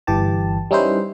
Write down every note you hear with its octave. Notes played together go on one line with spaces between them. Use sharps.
G1 E3 G4 A5
G3 C#4 D#4 E4 B4 C5